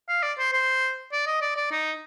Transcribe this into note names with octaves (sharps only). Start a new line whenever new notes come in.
F5
D5
C5
C5
D5
D#5
D5
D5
D#4